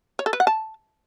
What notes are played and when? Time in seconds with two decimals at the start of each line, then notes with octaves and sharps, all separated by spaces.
0.19 C#5
0.26 A4
0.33 B4
0.40 F#5
0.47 A5